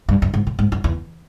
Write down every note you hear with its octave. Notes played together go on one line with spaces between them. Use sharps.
G2
F#2
G#2
A2
G#2
F#2
E2